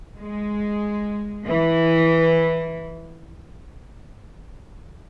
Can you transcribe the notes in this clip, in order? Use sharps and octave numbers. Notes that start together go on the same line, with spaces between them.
G#3
E3